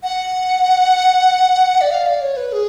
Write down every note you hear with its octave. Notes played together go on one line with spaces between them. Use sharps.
F#5
D5
F5
D5
C#5
B4
G#4